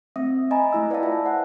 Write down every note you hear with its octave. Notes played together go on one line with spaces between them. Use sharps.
A3 C4 E5 D#6
D#5 G#5 A#5 B5
A3 E4 E6
B4 D5 E5 F5 G5 A5
F4 E5 A5
C5 F#5 G5